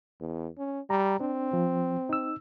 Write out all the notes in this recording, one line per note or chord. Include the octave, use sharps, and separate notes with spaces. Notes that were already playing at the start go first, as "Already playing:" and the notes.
E2
C#4
G3 A#5
C4 D4
F3
D#4 E6